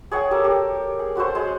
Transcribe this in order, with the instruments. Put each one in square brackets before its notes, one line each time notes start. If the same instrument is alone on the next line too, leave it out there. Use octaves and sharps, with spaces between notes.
[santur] G#4 C#5 F#5 G5
G4 A4 A#4
G4
G#4
C#4 F#4 A4 C5
G#3